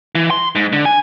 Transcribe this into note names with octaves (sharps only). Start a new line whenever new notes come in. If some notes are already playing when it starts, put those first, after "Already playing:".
E3
C6
G#2
D3
G#5